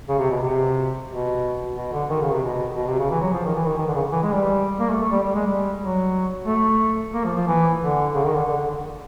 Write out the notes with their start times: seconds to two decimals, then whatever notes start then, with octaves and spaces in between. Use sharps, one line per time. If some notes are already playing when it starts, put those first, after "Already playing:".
0.09 C#3
0.19 C3
0.30 B2
0.42 C3
1.08 B2
1.76 B2
1.92 D3
2.10 D#3
2.21 C#3
2.32 C3
2.43 B2
2.76 B2
2.87 C3
2.99 C#3
3.11 E3
3.21 F#3
3.33 F3
3.45 D#3
3.55 E3
3.66 D#3
3.77 D#3
3.88 D3
3.94 C#3
4.12 E3
4.22 G#3
4.33 G3
4.79 A#3
4.90 A3
5.00 A3
5.12 G3
5.23 G3
5.35 G#3
5.46 G3
5.79 F#3
6.46 A3
7.14 A#3
7.25 F3
7.35 F3
7.47 E3
7.81 D3
8.14 C#3
8.25 D#3
8.37 D3
8.47 D3